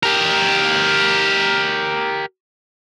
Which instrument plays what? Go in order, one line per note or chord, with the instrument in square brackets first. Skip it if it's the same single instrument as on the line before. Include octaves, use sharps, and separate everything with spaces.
[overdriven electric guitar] G4 A#4